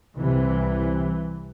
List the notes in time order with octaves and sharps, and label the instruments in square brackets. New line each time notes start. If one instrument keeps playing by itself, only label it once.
[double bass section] C2 C3 E3